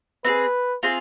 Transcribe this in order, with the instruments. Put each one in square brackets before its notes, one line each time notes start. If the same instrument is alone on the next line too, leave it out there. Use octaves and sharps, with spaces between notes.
[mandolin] C4 F4 G#4 [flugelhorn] B4
[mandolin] C4 F4 G#4